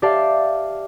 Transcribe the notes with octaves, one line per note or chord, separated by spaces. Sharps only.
G4 D5 E5 F5 A5